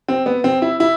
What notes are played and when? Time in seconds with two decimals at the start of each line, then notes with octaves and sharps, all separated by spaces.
0.08 C4
0.26 B3
0.44 C4
0.62 E4
0.80 E4